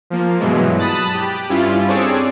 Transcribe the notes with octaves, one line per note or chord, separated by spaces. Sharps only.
F3 A#3
G2 B2 E3 F#3 G#3
A5 B5 D#6 F#6 A6
G4
G2 G3 C#4 E4 F4
C4 D4 G#4 A4 C#5 D5